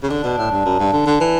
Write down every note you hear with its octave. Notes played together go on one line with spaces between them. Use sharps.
C#3
D3 D4
B2
A2
G2
F#2
G2
D3
D3
E3